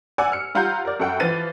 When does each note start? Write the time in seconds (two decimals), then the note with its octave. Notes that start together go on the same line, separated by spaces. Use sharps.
0.18 D5 F#5 G#5 E6
0.32 F6 C#7
0.55 G3 F4 F#5 A#5 G6
0.85 A#4 D5
1.00 F#2 A4 F#5 G5
1.20 E3 F3 A6 D#7